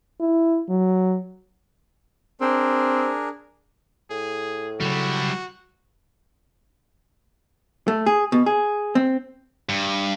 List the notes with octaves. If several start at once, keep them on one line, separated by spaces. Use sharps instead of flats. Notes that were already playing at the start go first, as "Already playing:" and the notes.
E4
F#3
C4 D4 G#4 A#4
A2 G#4
C#3 F#3 G3 E4 F#4
A3
G#4
B2
G#4
C4
G2